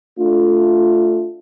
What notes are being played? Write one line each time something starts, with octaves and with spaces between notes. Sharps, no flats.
A3 D4 F4